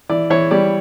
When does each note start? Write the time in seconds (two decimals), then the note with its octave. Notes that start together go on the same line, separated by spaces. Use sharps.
0.09 E3 D5
0.30 E3 C#5
0.51 G3 D5